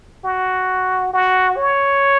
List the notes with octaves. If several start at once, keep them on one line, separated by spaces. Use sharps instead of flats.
F#4
F#4
C#5